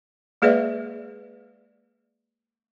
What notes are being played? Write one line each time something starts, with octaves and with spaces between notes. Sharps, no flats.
G#3 A#3 G#4 B4 D5 E5